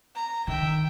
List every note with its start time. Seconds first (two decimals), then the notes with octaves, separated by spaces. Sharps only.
0.15 A#5
0.47 D#3 E5 G5